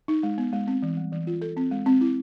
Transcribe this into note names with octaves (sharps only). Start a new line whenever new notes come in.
D#4
G#3
B3
G#3
C4
E3
G3
E3
F4
A4
C4
G#3
C4
E4